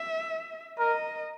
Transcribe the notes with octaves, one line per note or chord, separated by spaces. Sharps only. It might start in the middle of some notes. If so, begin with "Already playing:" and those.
Already playing: E5
A#4 D#5